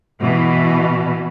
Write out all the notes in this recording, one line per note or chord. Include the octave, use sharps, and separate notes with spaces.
B2 E3